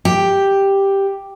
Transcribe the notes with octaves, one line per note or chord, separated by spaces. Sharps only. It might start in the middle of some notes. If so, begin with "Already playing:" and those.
G4